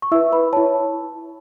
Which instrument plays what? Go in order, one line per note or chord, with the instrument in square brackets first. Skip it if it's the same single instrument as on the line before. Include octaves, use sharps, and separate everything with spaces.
[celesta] C#6
E4 B4 E5 E6
B4 B5
E4 C#5 A5